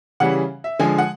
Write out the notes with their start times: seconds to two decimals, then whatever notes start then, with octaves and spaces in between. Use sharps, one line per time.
0.20 C#3 E3 G3 F#5
0.64 E5
0.79 D3 F3 G#3 G#5
0.98 F#5